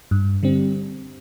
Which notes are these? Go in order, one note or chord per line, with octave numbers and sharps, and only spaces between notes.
G2
D3 G3 C4